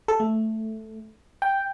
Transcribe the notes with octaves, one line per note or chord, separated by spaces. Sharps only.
A4
A3
G5